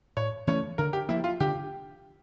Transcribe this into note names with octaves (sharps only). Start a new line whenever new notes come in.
A2 C#5
E3 A3 C#4 C#5
D3 A#4
G4
F3 A#3 E4
F4
D3 G4